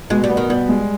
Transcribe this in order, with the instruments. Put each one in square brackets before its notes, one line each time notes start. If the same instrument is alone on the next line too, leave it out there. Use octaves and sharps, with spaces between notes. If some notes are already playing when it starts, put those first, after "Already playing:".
[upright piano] B2 [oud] G#3
[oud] G3
[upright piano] B3
[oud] D#3
[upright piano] B2 [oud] G3
[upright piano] G#3